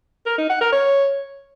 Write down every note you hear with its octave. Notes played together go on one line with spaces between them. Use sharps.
A#4
D#4
F#5
A#4
C#5